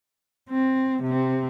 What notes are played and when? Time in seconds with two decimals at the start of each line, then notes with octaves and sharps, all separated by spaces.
0.49 C4
1.03 C3 C4